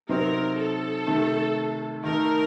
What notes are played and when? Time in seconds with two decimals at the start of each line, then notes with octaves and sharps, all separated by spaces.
0.09 C3 F#3 C4 D#4 A#4
0.57 A4
1.07 C3 D#3 A3
2.04 D#3 A3 D#4 A#4